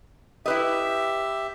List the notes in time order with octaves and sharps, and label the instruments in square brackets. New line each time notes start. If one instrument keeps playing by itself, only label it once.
[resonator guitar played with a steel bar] E4 B4 D#5 [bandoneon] G4 E5